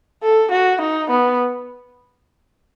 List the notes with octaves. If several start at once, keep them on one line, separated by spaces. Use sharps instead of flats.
A4
F#4
D#4
B3